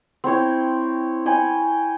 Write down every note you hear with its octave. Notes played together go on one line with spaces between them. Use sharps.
C4 E4 C#5 G5
C#5 G5 G#5 B5